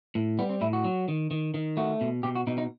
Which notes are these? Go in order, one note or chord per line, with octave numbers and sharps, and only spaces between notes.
A2
G3 B3
C4
A2 E4
F#4
F#3
D#3
D#3
D#3
A3 F#4
B2
B2 G4
F#4
B2 D#4
D#4